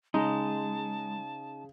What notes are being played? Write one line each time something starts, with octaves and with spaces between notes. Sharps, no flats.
C#3 G#3 D#4 A5